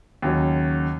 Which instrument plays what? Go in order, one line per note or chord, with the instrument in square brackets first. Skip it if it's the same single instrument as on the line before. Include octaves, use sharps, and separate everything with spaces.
[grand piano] D#2 C#3 F#3